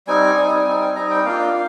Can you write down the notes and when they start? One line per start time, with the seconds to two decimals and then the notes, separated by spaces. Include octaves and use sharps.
0.07 G3 C4 D#4 G#5
0.36 G3 C4 D#4
0.67 G3 C4 D#4
0.96 G3 C4 D#4 A#5
1.11 G5
1.25 A#3 D4 F4 F5